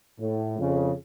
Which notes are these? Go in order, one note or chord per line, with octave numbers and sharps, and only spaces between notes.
A2
F2 C#3